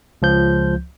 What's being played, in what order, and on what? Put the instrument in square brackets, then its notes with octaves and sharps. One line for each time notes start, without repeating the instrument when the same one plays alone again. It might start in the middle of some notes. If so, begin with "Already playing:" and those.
[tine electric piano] C#2 F3 G6